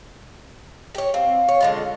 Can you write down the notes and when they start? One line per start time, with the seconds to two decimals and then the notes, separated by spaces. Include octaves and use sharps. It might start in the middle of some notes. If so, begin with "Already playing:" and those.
0.95 G4 C#5
1.14 C4 F5
1.49 C#5
1.61 D3 G#3 F4